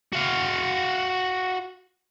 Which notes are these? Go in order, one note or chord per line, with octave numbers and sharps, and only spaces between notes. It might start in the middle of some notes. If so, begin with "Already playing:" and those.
F#4 F5